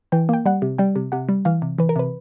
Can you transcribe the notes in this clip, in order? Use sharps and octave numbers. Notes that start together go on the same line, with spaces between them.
E3 G5
A#3 G5
G3 F#5
C3
G3 G5
C3
C3 F#5
G3
E3 F5
C3
E3 B4
A#4
C3 B4